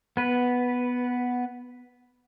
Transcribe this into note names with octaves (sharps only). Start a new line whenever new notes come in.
B3 B4